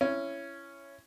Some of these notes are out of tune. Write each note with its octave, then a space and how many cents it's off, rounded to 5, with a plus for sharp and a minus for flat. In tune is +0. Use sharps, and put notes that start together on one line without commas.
C#4 +0 E4 +25